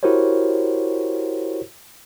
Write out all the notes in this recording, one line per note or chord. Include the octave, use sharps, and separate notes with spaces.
E4 F#4 G4 A#4 C5 C#5